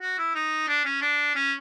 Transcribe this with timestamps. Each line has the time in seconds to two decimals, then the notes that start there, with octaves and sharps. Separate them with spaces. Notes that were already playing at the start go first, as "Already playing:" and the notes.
0.01 F#4
0.18 E4
0.35 D#4
0.68 D4
0.85 C#4
1.01 D4
1.35 C#4